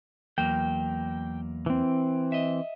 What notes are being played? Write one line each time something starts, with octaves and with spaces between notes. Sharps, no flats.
E2 F#3 A#3 G5
E3 C4
D#5 E5